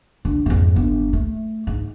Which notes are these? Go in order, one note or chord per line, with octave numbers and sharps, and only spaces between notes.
D3
F2 G#2
G1
A3
G#2